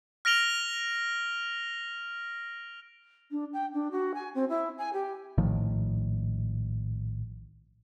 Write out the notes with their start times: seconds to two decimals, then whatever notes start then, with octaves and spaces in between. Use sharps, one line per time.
0.25 F6 A#6 D7 F7 G7
3.31 D4
3.53 G5
3.73 D4
3.91 F#4
4.14 G#5
4.34 C4
4.49 E4
4.78 G#5
4.93 G4
5.38 A#1 A2 D#3 F3